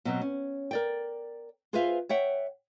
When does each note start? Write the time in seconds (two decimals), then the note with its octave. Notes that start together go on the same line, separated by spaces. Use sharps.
0.05 B2 F#3 C4
0.21 C#4
0.71 A#4 D5 G5
1.73 F4 G#4 B4 C5 E5 F5
2.09 C#5 E5 F#5 G5